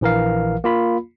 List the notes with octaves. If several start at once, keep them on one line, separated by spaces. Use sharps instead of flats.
A#1 E3 A#4 F5
A#3 F4 B5